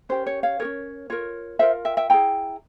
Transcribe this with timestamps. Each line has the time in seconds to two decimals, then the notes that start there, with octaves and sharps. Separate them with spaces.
0.09 C#4 G4 A#4 C5
0.26 C#5
0.43 C#5 F5
0.60 G4 A#4 C#5
0.65 C#4
1.10 F4 A#4 C#5
1.59 F4 A#4 C5 E5
1.85 E5 G5
1.97 E5 G5
2.10 E4 G#4 G5 A#5